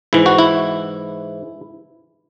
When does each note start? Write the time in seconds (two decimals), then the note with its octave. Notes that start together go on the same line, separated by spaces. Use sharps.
0.13 G#2 E3 E4
0.26 F#4
0.39 E4